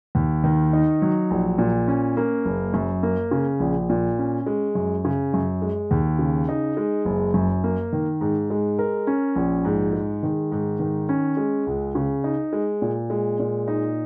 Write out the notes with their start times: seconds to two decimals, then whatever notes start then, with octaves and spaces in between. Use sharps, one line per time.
0.15 D#2
0.44 D#3
0.73 D#4
1.02 F#3
1.31 A#1
1.58 A#2
1.87 C#4
2.17 A#3
2.45 F#1
2.74 F#2
3.03 A#3
3.31 C#3
3.60 A#1
3.90 A#2
4.19 C#4
4.46 G#3
4.75 F#2
5.05 C#3
5.34 F#2
5.62 G#3
5.91 D#2
6.19 C#3
6.49 D#4
6.77 G#3
7.05 F#1
7.34 F#2
7.64 A#3
7.93 D#3
8.21 G#2
8.50 G#3
8.79 A#4
9.07 C#4
9.36 A#1
9.65 G#2
9.93 G#3
10.23 D#3
10.52 G#2
10.80 D#3
11.09 C#4
11.37 G#3
11.67 C#2
11.95 C#3
12.24 D#4
12.53 G#3
12.82 A#2
13.10 G#3
13.40 A#2
13.68 D#4